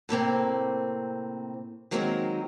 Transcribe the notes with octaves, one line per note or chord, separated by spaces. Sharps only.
A2 C3 A#3 C4
D#3 F#3 G#3 A#3 C4 D#4